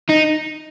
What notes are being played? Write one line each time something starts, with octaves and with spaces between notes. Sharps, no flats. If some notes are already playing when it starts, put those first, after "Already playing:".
D#4